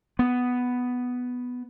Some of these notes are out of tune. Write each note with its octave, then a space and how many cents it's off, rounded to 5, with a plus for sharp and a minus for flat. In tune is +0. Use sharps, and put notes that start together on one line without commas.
B3 +5